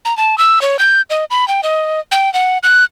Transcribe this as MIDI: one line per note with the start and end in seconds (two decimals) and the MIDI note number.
0.05 0.16 82
0.17 0.38 81
0.38 0.61 88
0.62 0.77 73
0.79 1.02 91
1.10 1.25 75
1.30 1.48 83
1.48 1.61 79
1.63 2.00 75
2.12 2.32 79
2.34 2.58 78
2.63 2.84 90